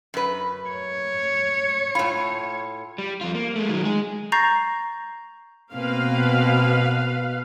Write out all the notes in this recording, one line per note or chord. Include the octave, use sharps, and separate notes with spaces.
F#2 B4
C#5
A2 F4 B5
G3
F2 F4
A#3
G#3 A3
D#3 F#3
G#3 G#4
A#5 C#6 G6 A6 A#6 C7
B2 A#3 C4 B4 F5